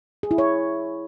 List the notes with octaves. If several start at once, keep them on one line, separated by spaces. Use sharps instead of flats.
G#4
E4
C#5